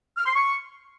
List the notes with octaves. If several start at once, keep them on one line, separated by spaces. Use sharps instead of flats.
F6
C6
C#6